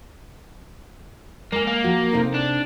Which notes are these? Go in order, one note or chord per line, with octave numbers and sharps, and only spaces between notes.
G#3 A#3 G#5
A#3
F3 F#4
C3 D#4 A4
D4